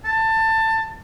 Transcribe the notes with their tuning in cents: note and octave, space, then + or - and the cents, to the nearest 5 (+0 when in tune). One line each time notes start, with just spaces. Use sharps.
A5 +20